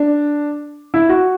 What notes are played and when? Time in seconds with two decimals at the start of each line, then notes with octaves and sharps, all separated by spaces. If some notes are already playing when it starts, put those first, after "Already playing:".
Already playing: D4
0.94 E4
1.09 F#4